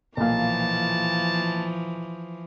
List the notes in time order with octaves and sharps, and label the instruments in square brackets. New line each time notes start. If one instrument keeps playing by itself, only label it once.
[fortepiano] B1 A#2 [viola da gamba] E3 F3 [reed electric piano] A#3 F5 [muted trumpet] A5